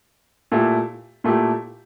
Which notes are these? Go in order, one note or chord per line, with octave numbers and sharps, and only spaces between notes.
A#2 A3 E4 G4
A#2 A3 E4 G4